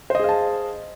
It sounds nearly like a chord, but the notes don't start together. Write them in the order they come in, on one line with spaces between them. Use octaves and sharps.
C5 D#5 G#4 F5 A5